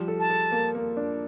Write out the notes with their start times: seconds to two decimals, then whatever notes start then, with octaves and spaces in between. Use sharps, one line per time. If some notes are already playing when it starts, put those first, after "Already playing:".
Already playing: F3 G3
0.08 A4
0.20 A5
0.30 A4
0.52 A#3
0.75 A#3
0.97 D4